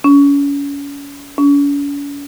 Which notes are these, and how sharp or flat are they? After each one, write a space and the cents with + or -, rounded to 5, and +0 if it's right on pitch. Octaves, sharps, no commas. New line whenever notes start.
C#4 +35
C#4 +45